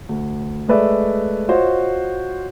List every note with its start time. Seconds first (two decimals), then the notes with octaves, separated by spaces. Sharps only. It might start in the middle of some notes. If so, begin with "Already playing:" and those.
0.09 D2
0.68 G#3 A3 B4 D5 E5
1.48 F4 F#4 C5 C#5 D#5